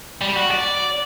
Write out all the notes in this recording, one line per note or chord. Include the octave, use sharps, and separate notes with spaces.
G3
F#4
D5